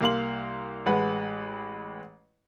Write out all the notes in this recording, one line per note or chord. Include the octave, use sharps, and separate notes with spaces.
C2 A#3 F5 C6 F#7
A1 G#3 B4 F#5